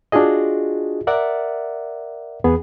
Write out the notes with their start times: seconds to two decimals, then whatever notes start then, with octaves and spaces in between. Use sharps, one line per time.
0.12 D4 F4 F#4 G#4 D#5
1.07 A#4 D5 E5 F#5
2.44 E2 B3 G#4